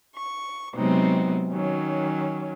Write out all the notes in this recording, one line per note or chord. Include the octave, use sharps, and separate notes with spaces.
C#6
C3 F#3 G#3 B3 C4 D#4
D#3 F#3 C#4